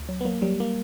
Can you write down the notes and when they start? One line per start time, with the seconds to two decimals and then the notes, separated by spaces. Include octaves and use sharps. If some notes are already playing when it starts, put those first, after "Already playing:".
Already playing: D2
0.09 F#3
0.21 B3
0.25 F#3 A#3
0.42 F#3 G3
0.60 A#3 G4